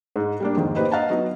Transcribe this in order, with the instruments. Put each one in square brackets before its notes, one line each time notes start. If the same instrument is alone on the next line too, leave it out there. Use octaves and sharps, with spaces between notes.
[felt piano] G#2 G#3
G3 A#3 D4
F2 G#2 D#3 F3
A#3 D#4 G4 B4 C5 D#5
D#5 F5 F#5 A5 A#5
F#3 B3 D#4